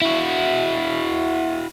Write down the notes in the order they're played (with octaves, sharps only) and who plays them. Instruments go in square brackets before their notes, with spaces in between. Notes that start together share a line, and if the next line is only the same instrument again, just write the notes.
[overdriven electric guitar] E4 F#4